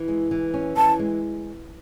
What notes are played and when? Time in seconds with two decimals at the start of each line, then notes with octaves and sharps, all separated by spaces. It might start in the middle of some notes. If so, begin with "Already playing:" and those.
Already playing: E3
0.08 G#3
0.31 E3
0.54 C#4
0.77 E3 A5
0.99 G#3